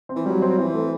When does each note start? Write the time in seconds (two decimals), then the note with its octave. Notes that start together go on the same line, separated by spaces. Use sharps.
0.09 C4
0.16 E3
0.25 F#3 G3
0.42 C4
0.58 E3 C4
0.74 A3